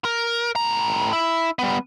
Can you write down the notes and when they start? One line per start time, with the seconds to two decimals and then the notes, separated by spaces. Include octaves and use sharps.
0.05 A#4
0.56 A2 A#5
1.13 E4
1.59 G3 B3